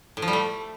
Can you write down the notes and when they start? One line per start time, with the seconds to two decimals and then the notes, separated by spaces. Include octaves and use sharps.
0.17 A2
0.22 F3
0.28 G3
0.33 A3